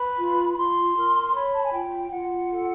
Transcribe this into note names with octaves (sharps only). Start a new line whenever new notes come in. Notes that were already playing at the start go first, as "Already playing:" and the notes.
Already playing: B4 B5
F4
B5
F4 C6
A#4
C#5 B5
A5
G#5
F4 G5
F4 F#5
A4